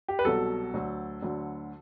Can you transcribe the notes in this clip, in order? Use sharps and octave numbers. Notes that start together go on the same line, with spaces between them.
G4
B4
C2 B2 F#3 A4
D2 D3 F#3
D2 D3 F#3